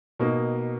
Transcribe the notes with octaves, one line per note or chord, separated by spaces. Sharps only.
B2 A#3 D#4